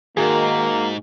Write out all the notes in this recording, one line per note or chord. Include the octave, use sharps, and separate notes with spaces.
G#2 D#3 A#3 F#4 G#4